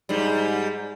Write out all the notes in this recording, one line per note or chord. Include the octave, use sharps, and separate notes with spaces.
G#2 G3